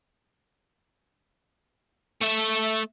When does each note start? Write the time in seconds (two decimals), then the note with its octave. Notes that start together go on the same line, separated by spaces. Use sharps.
2.22 A3 E5